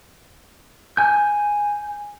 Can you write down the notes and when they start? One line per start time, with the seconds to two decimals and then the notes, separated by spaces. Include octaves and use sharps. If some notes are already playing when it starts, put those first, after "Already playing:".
0.97 G#5 G6